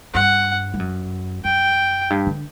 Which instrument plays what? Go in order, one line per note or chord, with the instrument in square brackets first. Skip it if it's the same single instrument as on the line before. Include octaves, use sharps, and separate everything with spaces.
[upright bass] G2 [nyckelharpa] F#5
[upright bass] G2
F#2
[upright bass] F#2 [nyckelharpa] G5
[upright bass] G2
D3